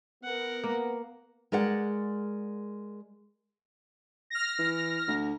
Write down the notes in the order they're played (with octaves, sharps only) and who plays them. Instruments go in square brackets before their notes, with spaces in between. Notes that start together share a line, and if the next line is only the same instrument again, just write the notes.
[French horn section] B3 [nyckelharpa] A#4 F#5
[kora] A#3
[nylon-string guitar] G#3 A#4 D5 F#5
[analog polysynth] F6 A#6
[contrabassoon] E3
D2